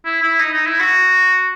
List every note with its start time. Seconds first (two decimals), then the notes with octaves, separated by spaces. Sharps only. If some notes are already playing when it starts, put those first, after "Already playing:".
0.06 E4
0.23 E4
0.40 D#4
0.54 D#4
0.67 E4
0.80 F#4